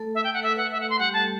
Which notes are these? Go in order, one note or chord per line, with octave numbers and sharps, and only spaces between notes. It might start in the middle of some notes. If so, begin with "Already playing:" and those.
Already playing: A3 A4
E5
G5
F#5
A4 E5
B4 F#5
A3 A4 E5
F#5
C6
G3 G4 F#5
A5